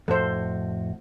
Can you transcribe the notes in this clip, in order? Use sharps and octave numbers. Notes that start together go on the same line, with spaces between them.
F2 A2 F#4 A4 C5